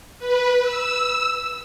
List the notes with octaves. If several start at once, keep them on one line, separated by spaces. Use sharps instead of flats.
B4
E6